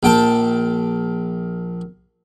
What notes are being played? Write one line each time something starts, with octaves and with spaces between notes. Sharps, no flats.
A#1 G5 A5